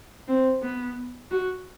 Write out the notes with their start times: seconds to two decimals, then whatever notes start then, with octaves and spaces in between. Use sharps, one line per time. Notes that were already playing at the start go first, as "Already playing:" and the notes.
0.28 C4
0.62 B3
1.31 F#4